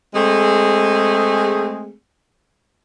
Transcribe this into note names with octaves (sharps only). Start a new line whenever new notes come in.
G#3 A3 C4 G#4